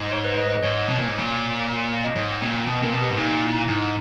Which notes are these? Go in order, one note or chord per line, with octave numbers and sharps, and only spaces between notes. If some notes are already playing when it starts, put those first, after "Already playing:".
Already playing: G#2
C#5
B4
D#5
D#5
G#2 C#5
B2
A#2
G#2
A#2
D#5
G#2 C#5
G5
A#2
G5
B2 G5
A#2 A#4
B2
G4
G#2
A#2 D#4
E4
G#2 D#4